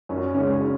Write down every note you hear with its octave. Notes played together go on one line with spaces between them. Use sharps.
F#2 C#4
C#3 G#3 C#4
C#4